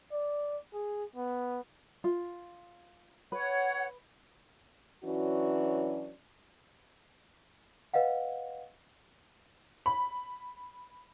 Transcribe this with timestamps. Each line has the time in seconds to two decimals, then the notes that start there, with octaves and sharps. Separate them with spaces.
0.12 D5
0.73 G#4
1.16 B3
2.04 F4
3.32 B4 C#5 F#5
5.04 E3 F#3 C#4 D4 F#4
7.94 B4 D#5 F5 F#5
9.86 B5